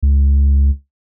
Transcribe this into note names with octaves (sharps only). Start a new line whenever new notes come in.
C#2